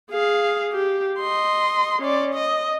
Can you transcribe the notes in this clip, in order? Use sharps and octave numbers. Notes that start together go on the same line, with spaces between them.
G#4 F5
G4
D#5 C6
C#4 D5
D#5